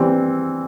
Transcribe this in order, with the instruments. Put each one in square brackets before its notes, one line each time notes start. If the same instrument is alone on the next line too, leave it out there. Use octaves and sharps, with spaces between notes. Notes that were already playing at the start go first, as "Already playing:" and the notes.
Already playing: [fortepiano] E3 G3 C4